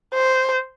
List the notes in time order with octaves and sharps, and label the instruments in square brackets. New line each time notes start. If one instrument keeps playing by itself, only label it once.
[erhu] C5